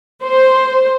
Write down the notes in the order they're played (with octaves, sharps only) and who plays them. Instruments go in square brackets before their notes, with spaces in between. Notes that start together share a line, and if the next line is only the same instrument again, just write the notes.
[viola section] C5